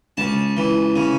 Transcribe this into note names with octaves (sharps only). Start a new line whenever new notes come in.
C#2 A5
E3
C#3